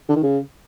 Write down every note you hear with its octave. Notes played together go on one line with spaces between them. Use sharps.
D3
D#3
C#3